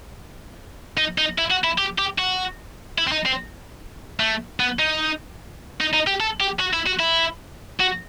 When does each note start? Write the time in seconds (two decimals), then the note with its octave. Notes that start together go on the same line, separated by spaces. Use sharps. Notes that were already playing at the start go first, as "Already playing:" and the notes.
0.98 D#4
1.18 D#4
1.38 E4
1.51 F#4
1.64 E4
1.78 G4
1.99 G4
2.19 F#4
2.98 E4
3.07 C4
3.12 D#4
3.26 C4
4.20 A3
4.60 B3
4.79 D#4
5.80 D#4
5.93 D#4
6.07 G4
6.20 A4
6.40 G4
6.60 F#4
6.74 E4
6.87 F#4
7.00 E4
7.80 F#4